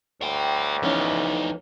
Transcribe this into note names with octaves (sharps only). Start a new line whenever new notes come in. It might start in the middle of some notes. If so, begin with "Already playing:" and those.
D2 C#5 G5
E3 F3 B3 C#4 D#4